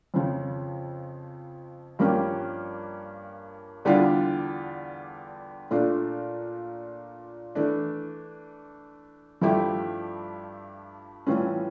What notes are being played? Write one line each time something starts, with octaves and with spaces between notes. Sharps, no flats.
F2 C#3 F3
G2 F3 A#3 C#4 G4
E2 D3 G3 D4 F4
A#2 A3 D4 F4
E3 A3 D4
G2 F3 A3 E4 G4
A2 E3 G3 C#4 F4